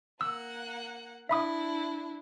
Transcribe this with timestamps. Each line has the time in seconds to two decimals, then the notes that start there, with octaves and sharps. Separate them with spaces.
0.21 A#3 F#5 E6
1.29 D4 E4 E5 B5 D#6